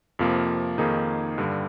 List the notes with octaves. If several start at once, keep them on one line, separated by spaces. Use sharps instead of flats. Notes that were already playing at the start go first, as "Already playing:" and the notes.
F2 C3 F3 A#3
F2 D#3 A#3 D#4 G#4
G2 D3 G3